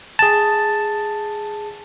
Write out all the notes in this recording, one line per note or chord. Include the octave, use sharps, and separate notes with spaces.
G#4 A5